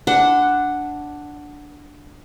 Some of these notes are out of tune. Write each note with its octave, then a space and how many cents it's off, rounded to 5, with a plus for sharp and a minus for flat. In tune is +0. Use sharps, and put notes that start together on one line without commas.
D4 +0 F#5 +0 C6 -40